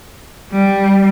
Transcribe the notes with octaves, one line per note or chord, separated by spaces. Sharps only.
G3